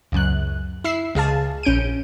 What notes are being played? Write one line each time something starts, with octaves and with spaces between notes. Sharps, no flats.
C#2 F#2 F#6
E4 E5 E6 C7
C#2 G#4 F5 A5
A#1 C#4 G6 D7 D#7